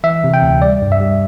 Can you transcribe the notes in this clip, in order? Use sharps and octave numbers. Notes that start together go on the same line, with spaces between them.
E3 E5
C3
G5
D2
G3 D5
G2
E5
G3